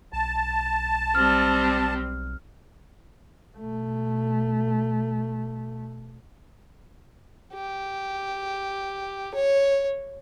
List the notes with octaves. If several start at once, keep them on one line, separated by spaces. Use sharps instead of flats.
B1 A5
G3 C4 F6
B2 A3
G4
C#5